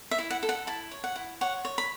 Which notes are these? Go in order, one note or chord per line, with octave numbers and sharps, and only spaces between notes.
E5
E4
F#5
A4
F#5
E4 A5
C#5
F#5
E4
C#5 F#5
C#5
B5